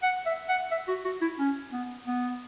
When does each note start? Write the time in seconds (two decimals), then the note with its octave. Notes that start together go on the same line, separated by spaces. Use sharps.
0.03 F#5
0.26 E5
0.49 F#5
0.71 E5
0.88 F#4
1.05 F#4
1.21 E4
1.39 C#4
1.72 B3
2.07 B3